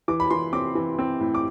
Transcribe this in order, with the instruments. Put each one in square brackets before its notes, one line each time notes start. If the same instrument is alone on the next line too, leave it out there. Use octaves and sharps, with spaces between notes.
[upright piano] E3 D6
B5
E3 C6
C4 D6
E3
C4
A2
D6